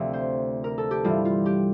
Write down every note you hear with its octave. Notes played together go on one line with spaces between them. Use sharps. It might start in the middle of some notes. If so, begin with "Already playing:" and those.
Already playing: D2 C3 F3
C5
A#4
A4
G4
G2 E3 G3 F4
F4
G4